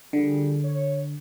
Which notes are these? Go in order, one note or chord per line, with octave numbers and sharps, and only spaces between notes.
D3 F3 G3 G#4
C#5